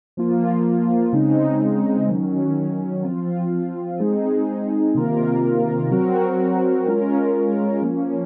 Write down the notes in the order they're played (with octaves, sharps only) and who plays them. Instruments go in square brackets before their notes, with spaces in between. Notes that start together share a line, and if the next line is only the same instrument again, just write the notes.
[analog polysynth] F3 A#3 F4
C#3 G#3 C4 D#4
D#3 F#3 C#4
F3 C4 F4
G#3 C4 D#4 G#4
C3 D#3 A#3 F4 A#4
F#3 C4 F#4 A#4
G#3 C#4 F4 A#4
F3 A#3 C#4